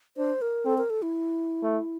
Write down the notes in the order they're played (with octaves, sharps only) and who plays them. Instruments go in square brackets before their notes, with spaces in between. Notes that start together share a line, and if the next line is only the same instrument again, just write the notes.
[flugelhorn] D4 [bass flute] C5
[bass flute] A#4
[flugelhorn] C4 [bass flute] A4
[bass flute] A#4
A4
E4
[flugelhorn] A3